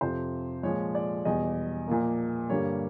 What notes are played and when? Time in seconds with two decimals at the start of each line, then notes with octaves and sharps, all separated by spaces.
0.01 F2 C3 F3 C5
0.63 A#2 F3 G#3 C#5
0.95 D5
1.25 E2 B2 G3 D#5
1.88 A#2 F3 A#3
2.49 G2 D3 G3 A#3 C#5